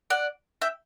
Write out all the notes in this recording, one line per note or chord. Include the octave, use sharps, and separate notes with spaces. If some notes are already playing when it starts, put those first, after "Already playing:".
D5 F#5
E5 G5